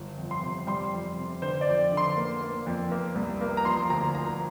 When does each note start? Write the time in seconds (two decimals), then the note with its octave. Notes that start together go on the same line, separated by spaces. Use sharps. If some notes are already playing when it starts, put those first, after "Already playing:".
Already playing: G1
0.17 F2
0.31 C6
0.43 C3
0.67 G3 C6
0.93 F2
1.17 C3
1.41 D3 C5
1.61 D5
1.67 F2
1.92 D3
1.97 C6
2.16 A#3
2.41 A#3
2.66 F2
2.91 A#3
3.15 C2
3.41 A#3
3.57 A#5
3.65 F3 C6
3.90 D2 A#5
4.15 F3 A#5